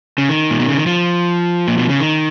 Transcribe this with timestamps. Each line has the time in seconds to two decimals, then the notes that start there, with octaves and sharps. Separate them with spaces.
0.18 C#3
0.29 D#3
0.50 A#2
0.59 B2
0.69 C#3
0.77 D#3
0.86 F3
1.68 A#2
1.78 B2
1.89 C#3
2.00 D#3